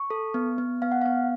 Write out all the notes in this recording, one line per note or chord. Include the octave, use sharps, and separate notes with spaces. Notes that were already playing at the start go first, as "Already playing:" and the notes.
Already playing: C#6
A4
B3
B3
B3 F5
F#5
B3 F5